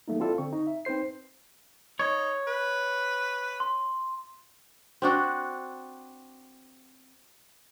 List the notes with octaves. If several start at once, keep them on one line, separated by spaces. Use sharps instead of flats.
E3 G3 A3 A#3 D#4
C4 E4 F4 A4 D5
D3 C4 C#6
D#4
E5
C4 D#4 B4 C5 C7
D#4 C#5
B4
C6
C4 D4 F#4